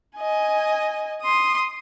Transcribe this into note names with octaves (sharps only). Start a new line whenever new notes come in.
D#5 G#5
C6 D#6